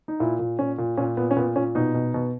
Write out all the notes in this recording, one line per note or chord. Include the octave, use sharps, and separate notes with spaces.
D#4
A#2 E4
A#2
A#2 C#4
A#2
A#2 C#4
A#2 B3
C#4
A#2 B3
A#2 C#4
B2 D#4
B2
B2